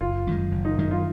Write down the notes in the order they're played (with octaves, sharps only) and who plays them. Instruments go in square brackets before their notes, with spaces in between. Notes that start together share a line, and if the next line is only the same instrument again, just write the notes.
[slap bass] F#1 [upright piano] F4
[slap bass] F#2 D#3 G#3
F#1
[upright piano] D#4
[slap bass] F#2 D#3 G#3 [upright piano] D#4
[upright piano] F4